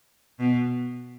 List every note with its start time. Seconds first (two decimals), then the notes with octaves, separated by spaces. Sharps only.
0.40 B2